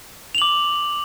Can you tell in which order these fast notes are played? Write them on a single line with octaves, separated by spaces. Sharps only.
F7 F#7 D6